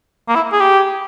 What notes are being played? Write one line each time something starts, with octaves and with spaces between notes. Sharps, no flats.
A#3
E4
G#4
G4